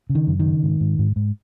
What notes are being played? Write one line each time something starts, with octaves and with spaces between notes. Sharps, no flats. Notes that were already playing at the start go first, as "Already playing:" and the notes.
C#3
D#3
F#2
D#3
C#3
G#2
G#2
G#2
G#2